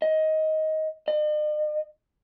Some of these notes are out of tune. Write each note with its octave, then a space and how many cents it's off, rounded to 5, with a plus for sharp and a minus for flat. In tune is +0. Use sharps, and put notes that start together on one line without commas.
D#5 +15
D#5 -45